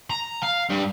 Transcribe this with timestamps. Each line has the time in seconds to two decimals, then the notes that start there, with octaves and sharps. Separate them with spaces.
0.10 A#5
0.43 F5
0.70 G2